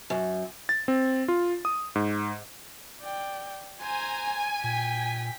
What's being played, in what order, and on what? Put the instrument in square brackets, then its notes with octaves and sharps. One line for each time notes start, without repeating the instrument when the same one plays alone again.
[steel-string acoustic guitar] F#2
[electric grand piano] A6
C4
F4
D#6
G#2
[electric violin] D5 G5
[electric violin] C5 A#5 [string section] G#5
[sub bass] A#2 [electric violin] G5 B6